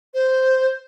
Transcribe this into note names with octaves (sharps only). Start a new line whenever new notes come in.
C5